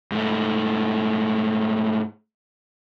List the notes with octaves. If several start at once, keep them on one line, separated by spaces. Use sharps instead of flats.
G#2 A3